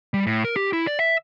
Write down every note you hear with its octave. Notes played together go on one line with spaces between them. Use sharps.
G3
A2
A#4
G4
E4
D5
E5